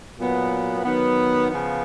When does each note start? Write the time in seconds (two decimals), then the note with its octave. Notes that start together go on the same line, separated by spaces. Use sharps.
0.18 A#2 F#3 B3
0.84 D#3 F#3 B3
1.49 C#3 F3 B3